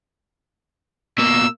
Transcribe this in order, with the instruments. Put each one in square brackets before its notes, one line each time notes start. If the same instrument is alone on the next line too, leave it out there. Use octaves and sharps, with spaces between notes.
[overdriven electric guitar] B2 A#3 [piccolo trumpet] E6